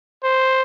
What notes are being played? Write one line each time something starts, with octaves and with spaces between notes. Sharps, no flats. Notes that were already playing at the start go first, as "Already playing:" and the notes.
C5